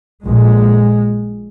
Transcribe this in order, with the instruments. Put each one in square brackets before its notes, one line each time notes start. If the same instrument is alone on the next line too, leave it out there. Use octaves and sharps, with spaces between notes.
[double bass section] A#1 A#2 G#3